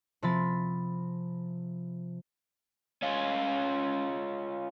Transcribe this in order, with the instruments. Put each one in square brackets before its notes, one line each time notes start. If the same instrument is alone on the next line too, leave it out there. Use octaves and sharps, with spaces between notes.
[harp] C3 F3 C4 B5 A6
[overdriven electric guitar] C#4 F4